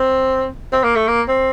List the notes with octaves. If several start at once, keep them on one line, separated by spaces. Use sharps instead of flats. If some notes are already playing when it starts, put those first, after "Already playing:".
Already playing: C4
C4
A#3
A3
A#3
C4